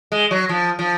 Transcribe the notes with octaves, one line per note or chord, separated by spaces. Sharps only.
G#3
F#3
F3
F3